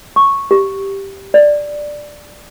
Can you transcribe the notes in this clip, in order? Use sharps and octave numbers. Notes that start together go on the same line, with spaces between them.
C#6
G4
D5